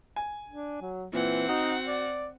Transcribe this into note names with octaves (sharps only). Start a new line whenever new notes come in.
G#5
D4
F#3
A#2 E3 C4 F#5
D#4 F#4
D5